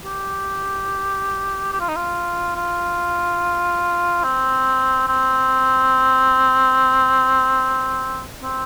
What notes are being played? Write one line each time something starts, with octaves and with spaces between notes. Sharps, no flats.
G4
G4
F4
D#4
F4
F4
C4
C4
C4